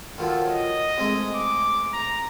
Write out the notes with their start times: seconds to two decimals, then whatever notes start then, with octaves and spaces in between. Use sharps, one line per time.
0.18 D#3 F3 F#3 A4
0.50 D#5
0.98 C3 G#3 A3
1.35 D6
1.93 A#5